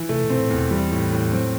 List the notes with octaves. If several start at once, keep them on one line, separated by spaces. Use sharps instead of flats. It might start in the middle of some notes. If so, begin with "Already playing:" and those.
Already playing: E3
C3 A3
B2
C4
A2
E2
B2
E3 G3
A2
A2
F#3 C4